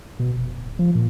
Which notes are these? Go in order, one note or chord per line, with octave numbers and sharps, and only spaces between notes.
B2
F1
D1
F3
A#2